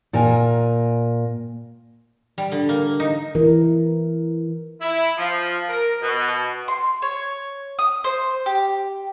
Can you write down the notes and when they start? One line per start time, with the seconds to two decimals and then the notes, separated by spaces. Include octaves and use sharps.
0.13 A#2 A#4 G5 G#5
2.38 G3
2.52 D3
2.69 A#3
3.00 D#4
3.35 E3 A#4
4.81 E4
5.17 F3
5.69 A#4
6.01 B2
6.68 C6
7.02 C#5
7.79 D#6
8.04 C5
8.46 G4